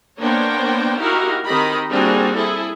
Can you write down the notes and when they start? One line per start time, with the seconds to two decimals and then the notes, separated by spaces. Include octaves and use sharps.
0.21 A#3 B3 D4 C5 C#5 G5
1.01 D#4 E4 F#4 G4 A#4 F5
1.46 D#3 C4 G4 D#5 B5
1.90 G3 A#3 C4 D4 F#4 G#4
2.37 E4 G#4 A4